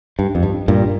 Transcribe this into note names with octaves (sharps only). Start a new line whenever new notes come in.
G2
F2
G2
G2 A#2